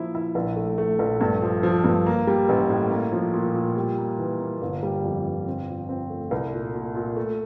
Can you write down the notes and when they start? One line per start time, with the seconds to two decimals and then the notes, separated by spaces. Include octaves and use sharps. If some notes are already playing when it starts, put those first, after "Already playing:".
Already playing: F3 A#3 E4
0.15 E4
0.35 A#1
0.56 A3
0.78 A3
0.99 A#1
1.21 G2
1.42 F3
1.63 F3
1.84 G2
2.06 A#3
2.27 G3
2.49 A1
2.70 A2
2.91 A#3
3.12 F3
3.33 A#2
3.55 A#2
3.77 G3
3.98 A#3
4.18 E3
4.40 A#3
4.62 G1
4.83 G3
5.04 F2
5.26 G1
5.47 C4
5.68 F3
5.89 C4
6.10 A3
6.31 C2
6.53 A#2
6.74 A#2
6.95 A#2
7.16 A3